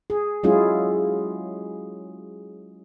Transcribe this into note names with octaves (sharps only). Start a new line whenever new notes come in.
G#4
F#3 G#3 C#4 E4 F4 G#4